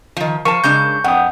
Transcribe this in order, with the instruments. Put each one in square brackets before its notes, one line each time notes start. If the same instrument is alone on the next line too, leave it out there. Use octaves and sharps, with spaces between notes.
[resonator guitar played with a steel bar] D#3 F3
[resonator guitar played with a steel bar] F3 A5 [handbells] A#4 [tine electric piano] C#6
[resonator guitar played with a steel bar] C#3 G#3 D4 [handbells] G6
[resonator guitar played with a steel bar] F2 [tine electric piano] F#5 G5 D#6